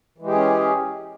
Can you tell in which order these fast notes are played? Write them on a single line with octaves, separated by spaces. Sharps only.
E3 G#3 G4 G#4 C#4